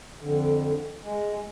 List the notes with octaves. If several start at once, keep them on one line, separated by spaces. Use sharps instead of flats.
F2 D3
G#3